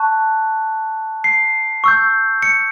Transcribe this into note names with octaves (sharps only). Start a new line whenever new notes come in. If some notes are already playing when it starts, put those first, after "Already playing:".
Already playing: A5 C#6 F#6
C7
C#6 E6 G6
C#7